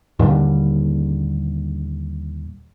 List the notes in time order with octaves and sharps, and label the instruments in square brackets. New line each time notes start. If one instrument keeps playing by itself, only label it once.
[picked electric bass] D#2 A#2 D3 G3